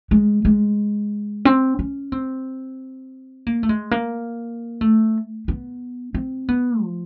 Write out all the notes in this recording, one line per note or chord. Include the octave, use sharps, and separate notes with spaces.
G#3
G#3
C4
C#4
C4
A#3
A3
G#3
A#3
A3
B3
C4
B3
F3